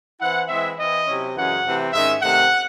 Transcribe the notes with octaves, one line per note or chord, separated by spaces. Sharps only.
E3 C4 E4 F#5
E3 G#3 C4 E4 E5
E3 C4 E4 D#5
C3 F#3 C#4 E4
F#2 C#3 E3 G#3 C#4 F#5
C3 E3 A3 C4
G#2 D#3 G#3 C#4 E5
C3 D#3 A3 C4 F#5